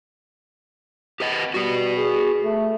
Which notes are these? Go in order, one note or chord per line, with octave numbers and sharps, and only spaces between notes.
G4 B4 D#5
G3 F#4 B4
G#4
A3